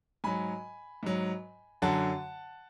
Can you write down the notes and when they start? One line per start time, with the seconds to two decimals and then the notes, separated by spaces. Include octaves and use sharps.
0.24 G#2 F#3 G#5 B5
1.03 G#2 F#3
1.82 F#2 D3 F#3 F#5 A5